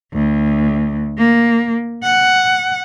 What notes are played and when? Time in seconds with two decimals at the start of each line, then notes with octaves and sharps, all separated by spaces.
0.13 D2
1.18 A#3
2.03 F#5